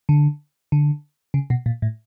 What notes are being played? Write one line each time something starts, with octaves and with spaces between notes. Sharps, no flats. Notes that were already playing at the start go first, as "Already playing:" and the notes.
D3
D3
C#3
B2
A#2
A2